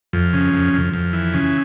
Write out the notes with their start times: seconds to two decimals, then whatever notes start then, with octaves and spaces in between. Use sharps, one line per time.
0.13 F2
0.33 C#3
0.53 F2
0.73 F2
0.93 F2
1.13 E3
1.34 C#3